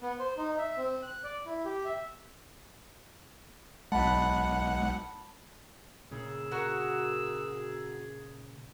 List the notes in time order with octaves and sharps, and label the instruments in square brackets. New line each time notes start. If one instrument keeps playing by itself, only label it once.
[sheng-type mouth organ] B3
C5
D#4
E5
C4
F#6
D5
E4
G4
E5
[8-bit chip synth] B1 F#5 [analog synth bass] G#3 [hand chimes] A5 B5
[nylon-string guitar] A#2 C#3 [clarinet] G#4 [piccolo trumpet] E6
[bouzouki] F#4 A#4 F#5